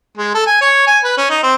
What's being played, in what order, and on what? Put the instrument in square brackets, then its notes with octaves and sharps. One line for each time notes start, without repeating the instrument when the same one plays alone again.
[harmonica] G#3
A4
G#5
C#5
G#5
B4
C#4
D#4
C4